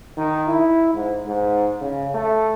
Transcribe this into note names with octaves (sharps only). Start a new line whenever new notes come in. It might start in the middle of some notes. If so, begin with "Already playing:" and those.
D#3
E4
G#2
G#2
C#3
A3